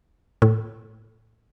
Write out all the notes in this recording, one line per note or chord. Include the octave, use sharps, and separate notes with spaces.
A2